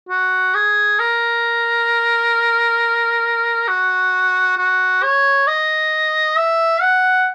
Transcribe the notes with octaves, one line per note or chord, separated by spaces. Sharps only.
F#4
G#4
A#4
F#4
F#4
C#5
D#5
E5
F#5